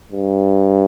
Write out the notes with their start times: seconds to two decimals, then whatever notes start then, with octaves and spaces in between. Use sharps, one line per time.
0.12 G2